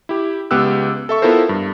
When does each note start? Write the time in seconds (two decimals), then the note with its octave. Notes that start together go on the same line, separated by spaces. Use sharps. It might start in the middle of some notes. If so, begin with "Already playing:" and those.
0.09 E4 G4
0.51 C#2 B3 G4 E6 F#6
1.09 A4 E5 C#6
1.22 B3 E4 F4 A4 A#4 C5
1.49 G2